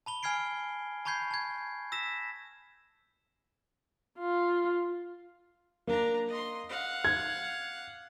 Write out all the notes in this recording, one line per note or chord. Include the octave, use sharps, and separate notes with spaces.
A5 B5 G7
G#5 F6 G#6 C7 D7
A5 B5 C#6 G6 G#6 C7
A5 G#6
E6 A#6 B6 E7
F4
A#3 D4 A#5
D#5 C6
F5 F#5
G#6